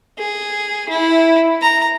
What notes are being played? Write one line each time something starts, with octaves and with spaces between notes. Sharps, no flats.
G#4
E4
A#5